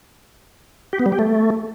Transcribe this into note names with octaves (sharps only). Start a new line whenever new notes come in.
G4
B3
G3
G4
A3